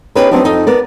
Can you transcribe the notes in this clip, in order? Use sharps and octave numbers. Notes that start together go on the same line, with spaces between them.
B3 C#4 D#4 G4 G#4 B4
F#3 B3 C4 D4 D#4 G4
F2 D#4 A4 D#5
B3 A#4 D5